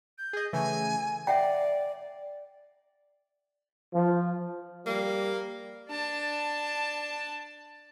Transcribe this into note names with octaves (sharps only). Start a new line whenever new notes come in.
G6
G#4 D#5
C#3 E3 A3 G#5
D5 E5 F#5 G5
F3
G3 A#3
D4 A5